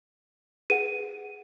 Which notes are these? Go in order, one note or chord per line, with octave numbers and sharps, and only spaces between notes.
G#4 B4 F#5 D#7